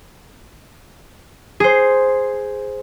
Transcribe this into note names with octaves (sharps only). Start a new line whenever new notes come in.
G#4 C5